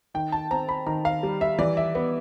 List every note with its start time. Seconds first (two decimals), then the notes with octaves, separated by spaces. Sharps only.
0.14 D#3 G5
0.32 A5
0.51 C4 A#5
0.69 B5
0.87 D#3 A#5
1.05 F5
1.23 G3
1.41 E5
1.58 E3 D5
1.77 E5
1.95 B3